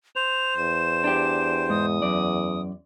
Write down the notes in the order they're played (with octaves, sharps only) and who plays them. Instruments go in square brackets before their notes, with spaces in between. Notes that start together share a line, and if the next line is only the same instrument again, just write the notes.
[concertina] C5 [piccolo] F7
[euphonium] E2 [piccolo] E7
[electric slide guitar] D4 G4
[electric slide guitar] G#2 [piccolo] D#6
[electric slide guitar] F#2 D5